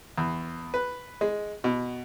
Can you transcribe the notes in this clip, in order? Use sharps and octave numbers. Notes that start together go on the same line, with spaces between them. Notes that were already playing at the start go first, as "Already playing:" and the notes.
E2
B4
G#3
B2